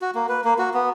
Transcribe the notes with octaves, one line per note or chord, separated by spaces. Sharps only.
F#4
A#3
B4
A#3
F#4
B3